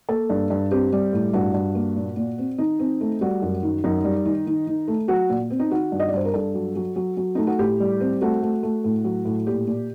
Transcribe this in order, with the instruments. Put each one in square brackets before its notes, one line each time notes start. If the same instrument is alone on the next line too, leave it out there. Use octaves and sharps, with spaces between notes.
[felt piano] A#3 A4
G2
G2
C4 G4
G3
A2
G2 F#4
G2
A#3
A#2
A#2
C4
D#3 D#4
C4
A3
G3 F#4
F#2
D#3
F#2 D#4
G3
D#3
D#3
D#3
A3
F#3 F#4
A#2
C4
D#4
D#3 F#4
G2
D#5
D5
G2 C5
A#4
G2 A4
F#3
F#3
F#3
F#3
A3 D#4
F#4
A2 G4
G3
C4
A3 F#4
A3
A3
A2
F#3
A2
A#2 G4
A#2